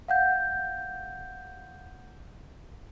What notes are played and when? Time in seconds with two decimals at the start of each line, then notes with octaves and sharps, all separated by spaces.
0.08 F5 F#5 G6